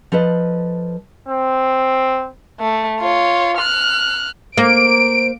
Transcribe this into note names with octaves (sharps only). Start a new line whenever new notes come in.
F3 A4 B4 D#5
C4
A3
F4 C#5
F6 F#6
A#3 C5 D7